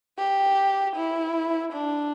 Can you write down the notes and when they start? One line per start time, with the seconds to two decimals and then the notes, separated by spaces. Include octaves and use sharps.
0.18 G4
0.96 E4
1.73 D4